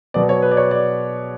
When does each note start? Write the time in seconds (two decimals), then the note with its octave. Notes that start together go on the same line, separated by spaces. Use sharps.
0.14 B2 F#3 B3 D5
0.29 C#5
0.42 B4
0.51 D5
0.57 C#5
0.71 D5